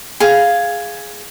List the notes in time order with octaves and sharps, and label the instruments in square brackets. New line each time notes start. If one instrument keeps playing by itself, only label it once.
[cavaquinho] G#4 F5